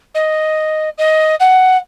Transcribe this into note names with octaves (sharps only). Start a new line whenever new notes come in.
D#5
D#5
F#5